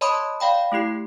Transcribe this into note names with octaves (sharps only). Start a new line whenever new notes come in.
C#5 D#5 A5 B5 C6 D#6
D5 F5 G5 B5
A3 E4 G4 C7